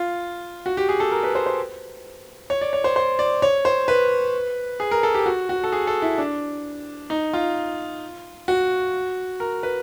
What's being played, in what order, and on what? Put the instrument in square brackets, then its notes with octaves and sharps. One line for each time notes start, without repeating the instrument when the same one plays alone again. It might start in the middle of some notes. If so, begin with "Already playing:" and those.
Already playing: [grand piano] F4
F#4
G4
G#4
A4
A#4
B4
C5
C5
C#5
D5
C#5
C5
C5
D5
C#5
C5
B4
G#4
A#4
A4
G4
F#4
F#4
A4
G#4
A4
E4
D4
D#4
F4
F#4
A#4
B4